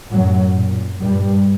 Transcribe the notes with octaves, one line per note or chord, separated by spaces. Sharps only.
F#2 A2 F#3
A#2
G2 A#2 G3